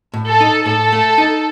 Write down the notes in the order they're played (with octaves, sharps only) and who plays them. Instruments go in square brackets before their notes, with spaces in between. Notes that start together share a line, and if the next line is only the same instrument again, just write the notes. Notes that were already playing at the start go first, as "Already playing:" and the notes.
[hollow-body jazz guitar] A2
[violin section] A4
[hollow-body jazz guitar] D#4
[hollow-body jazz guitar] A2 [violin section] A4
[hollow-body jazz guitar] A3
D#4